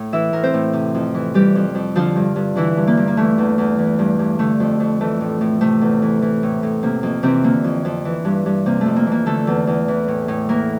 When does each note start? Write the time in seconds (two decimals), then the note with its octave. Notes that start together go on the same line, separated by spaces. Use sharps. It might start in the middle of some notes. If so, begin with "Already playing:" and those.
Already playing: A2
0.12 E3 E4 E5
0.33 A2 A#4
0.43 C4 C5
0.54 A2
0.73 C3
0.94 F2
1.14 E3
1.34 E3 G3 G4
1.55 F2
1.75 F2
1.96 D3 F3 F4
2.16 G2
2.36 G2
2.56 D3 E3 E4
2.77 G2
2.87 A#3
2.97 G2
3.08 A#3
3.17 E3 A3
3.38 E2
3.58 E2
3.79 E3
3.99 G2
4.19 G2
4.39 D3 A3
4.60 F2
4.80 F2
5.00 E3 A3
5.21 A2
5.41 A2
5.61 C3 A3
5.81 E2
6.02 E3
6.22 E3
6.43 A2
6.63 A2
6.83 C3 A#3
7.03 F2 A#3
7.23 C3 E3 C4
7.43 D3 A#3
7.64 F2
7.85 F2
8.05 E3
8.25 G2
8.46 G2
8.66 C3 A#3
8.81 F2 A3
8.96 A#3
9.06 E3
9.12 A#3
9.26 D3 A3 A4
9.47 E2
9.67 E2
9.88 E3
10.08 A2
10.28 A2
10.49 E3 A#3 A#4